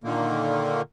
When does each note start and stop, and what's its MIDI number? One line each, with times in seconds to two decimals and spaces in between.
0.04 0.82 46
0.04 0.82 50
0.04 0.82 51
0.04 0.82 58